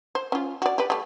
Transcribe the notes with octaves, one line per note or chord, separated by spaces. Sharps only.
C5
C#4 F4
F#4 D5
G4 B4
G3 A3